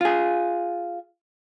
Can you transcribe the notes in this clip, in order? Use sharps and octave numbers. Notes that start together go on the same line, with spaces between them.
F4 G#4